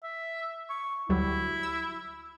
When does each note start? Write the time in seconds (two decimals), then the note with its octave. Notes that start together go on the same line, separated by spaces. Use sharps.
0.03 E5
0.69 C#6
1.09 D2 F#3 G3 E4
1.63 E6